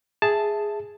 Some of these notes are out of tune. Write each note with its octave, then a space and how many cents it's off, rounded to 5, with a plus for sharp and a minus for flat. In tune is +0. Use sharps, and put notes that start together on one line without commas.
G#4 +0 E5 +0 A5 +0